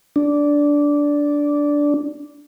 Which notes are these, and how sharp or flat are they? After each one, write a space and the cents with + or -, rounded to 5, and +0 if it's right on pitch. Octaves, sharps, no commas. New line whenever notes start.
D4 -10